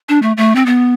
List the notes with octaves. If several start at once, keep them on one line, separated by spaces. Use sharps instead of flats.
D4
A3
A3
C4
B3